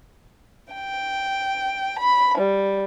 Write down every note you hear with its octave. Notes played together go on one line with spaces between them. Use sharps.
G5
B5
G3